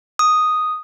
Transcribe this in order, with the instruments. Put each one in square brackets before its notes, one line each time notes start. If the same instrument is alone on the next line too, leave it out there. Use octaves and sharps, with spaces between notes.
[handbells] D#6